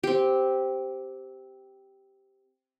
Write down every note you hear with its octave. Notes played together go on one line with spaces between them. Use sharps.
C4 G4